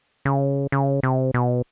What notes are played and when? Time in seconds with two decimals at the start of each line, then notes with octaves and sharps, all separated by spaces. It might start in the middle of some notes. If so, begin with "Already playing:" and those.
0.25 C#3
0.72 C#3
1.03 C3
1.34 B2